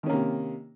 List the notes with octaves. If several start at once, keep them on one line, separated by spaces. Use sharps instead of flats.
C3 D#3 A#3 C#4